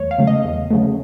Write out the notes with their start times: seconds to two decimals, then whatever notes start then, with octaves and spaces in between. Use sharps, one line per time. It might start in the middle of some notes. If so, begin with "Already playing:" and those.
Already playing: E2 F#3 A3 C#5
0.11 F5
0.18 C#3 F#3 A3
0.27 D#5
0.45 E2
0.71 C#3 F#3 A3